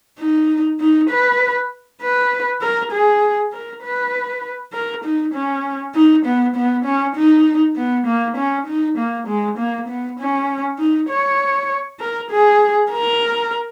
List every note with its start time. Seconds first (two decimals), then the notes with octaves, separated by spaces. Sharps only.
0.19 D#4
0.80 D#4
1.10 B4
2.02 B4
2.62 A#4
2.92 G#4
3.52 A#4
3.83 B4
4.73 A#4
5.04 D#4
5.34 C#4
5.95 D#4
6.25 B3
6.56 B3
6.85 C#4
7.16 D#4
7.77 B3
8.06 A#3
8.37 C#4
8.67 D#4
8.98 A#3
9.27 G#3
9.58 A#3
9.88 B3
10.19 C#4
10.79 D#4
11.09 C#5
12.00 A#4
12.31 G#4
12.91 A#4